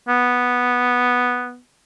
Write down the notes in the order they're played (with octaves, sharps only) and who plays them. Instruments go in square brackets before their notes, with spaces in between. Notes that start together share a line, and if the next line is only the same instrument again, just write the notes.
[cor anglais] B3